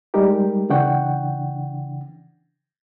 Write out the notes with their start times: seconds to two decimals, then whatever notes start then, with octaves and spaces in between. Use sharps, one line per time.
0.14 G3 G#3 D#4 G4 A#4
0.70 C#3 E3 D4 F#5 G5 C#6